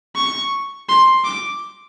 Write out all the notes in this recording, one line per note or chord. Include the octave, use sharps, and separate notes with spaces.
C#6
C6
D6